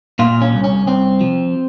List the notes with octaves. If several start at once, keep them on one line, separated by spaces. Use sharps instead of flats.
A#2 F4
C#4
C2
C#4
C2 C4
F3